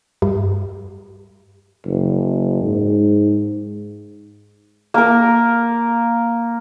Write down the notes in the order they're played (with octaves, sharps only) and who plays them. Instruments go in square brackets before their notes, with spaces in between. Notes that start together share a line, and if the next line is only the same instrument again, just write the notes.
[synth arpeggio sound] G2
[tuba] F#1
G#2
[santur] A#3 A#4